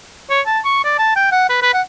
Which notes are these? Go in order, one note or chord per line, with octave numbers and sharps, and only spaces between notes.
C#5
A5
C#6
D5
A5
G5
F#5
B4
B4
F#5